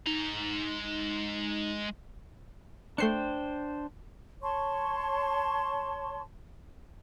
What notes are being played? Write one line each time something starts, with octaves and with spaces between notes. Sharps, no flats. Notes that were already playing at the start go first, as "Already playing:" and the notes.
G#3 D#4 A#5
A3 D4 C5 G5 C7 C#7
C#5 A5 C6 C#6